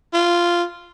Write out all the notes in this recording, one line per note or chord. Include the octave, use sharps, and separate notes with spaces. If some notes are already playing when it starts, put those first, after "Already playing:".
F4